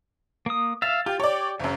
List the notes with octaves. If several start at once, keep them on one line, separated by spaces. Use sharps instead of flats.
A#3 D#6
E5 F5 A6
F4 G4
G4 C#5 D5
F#1 F#2 C#3